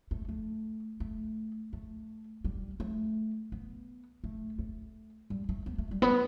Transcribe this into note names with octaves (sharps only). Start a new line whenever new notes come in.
A3
A3
A3
A3
G3
A3
B3
A3
A3
G3
A3
B3
A3
G3
B3